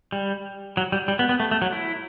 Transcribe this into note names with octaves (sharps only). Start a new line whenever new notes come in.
G3
F#3
G3
G3
B3
B3
A3
A3
F#3
E4